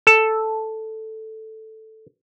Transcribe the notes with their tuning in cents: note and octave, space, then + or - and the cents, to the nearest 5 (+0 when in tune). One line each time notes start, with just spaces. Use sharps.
A4 +0